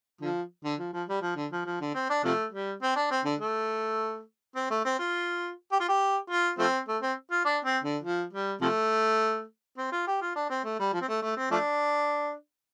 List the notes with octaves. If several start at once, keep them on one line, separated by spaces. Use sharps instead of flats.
D3 F3
D3
F3
F3
G3
F3
D3
F3
F3
D3
C4
D4
C3 F3 A3
G3
C4
D4
C4
D3
A3
C4
A3
C4
F4
G4
F4
G4
F4
F3 A3 C4
A3
C4
F4
D4
C4
D3
F3
G3
C3 F3 A3
C4
F4
G4
F4
D4
C4
A3
G3
F3
C4
A3
A3
C4
F3 A3 D4